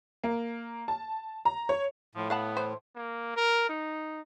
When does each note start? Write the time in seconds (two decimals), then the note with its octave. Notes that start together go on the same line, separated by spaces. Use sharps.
0.24 A#3
0.88 A5
1.45 A#5
1.69 C#5
2.15 A2 F3
2.30 B3 F5 F#5 A5
2.57 E3 C5
2.96 A#3
3.36 A#4
3.69 D#4